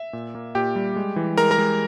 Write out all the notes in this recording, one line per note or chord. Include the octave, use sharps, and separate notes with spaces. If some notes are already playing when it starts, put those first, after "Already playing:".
Already playing: E5
A#2
A#3
A#2 G4 G5
G3
G#3
E3
G#3 A#4 A#5
A#4 A#5
G#3